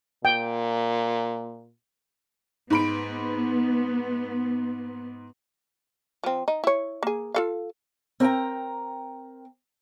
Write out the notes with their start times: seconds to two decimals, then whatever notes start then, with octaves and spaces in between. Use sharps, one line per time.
0.25 A#2 G5
2.70 G#2 B3 B5 D7
6.24 F3 C4
6.48 D#4
6.64 E4 C#5
7.03 A#3 G#4
7.35 F4 A4 F5
8.20 C4 A#4 G5 A#5